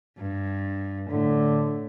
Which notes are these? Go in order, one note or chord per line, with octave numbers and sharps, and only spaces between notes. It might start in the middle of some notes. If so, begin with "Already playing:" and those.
G2
A2 D3